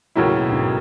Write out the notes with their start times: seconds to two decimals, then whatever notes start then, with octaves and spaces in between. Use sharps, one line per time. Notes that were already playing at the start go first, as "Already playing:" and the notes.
0.16 D#2 A2 C#3 F#3 C#4 E4
0.34 B2
0.52 G#2